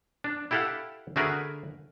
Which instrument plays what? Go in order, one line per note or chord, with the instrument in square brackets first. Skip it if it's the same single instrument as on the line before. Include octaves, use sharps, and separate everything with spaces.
[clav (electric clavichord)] D4
E4 G4 A4 F5 F#5
D3 A3 F#4 G#4 A#4 B4